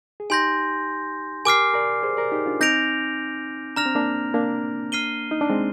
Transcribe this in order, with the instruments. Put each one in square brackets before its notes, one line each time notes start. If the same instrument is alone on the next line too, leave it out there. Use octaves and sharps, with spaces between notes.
[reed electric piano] G#4
[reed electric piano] D#4 G4 [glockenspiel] G#5 C6 G6 A#6
[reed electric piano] G4 A#4 [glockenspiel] G#5 D6 F6 C7
[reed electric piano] A#4 D5
G#4 C5
A#4 D5
D#4 G4
D4 F4
[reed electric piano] C4 D#4 [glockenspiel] G6 A#6 D7 F7
[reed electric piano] D4 [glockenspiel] A#5 F6 A#6 F7
[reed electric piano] C4
A#3 D4
A#3 D4
[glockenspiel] F6 C7 D#7 G7
[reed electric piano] D#4
D4
G#3 C4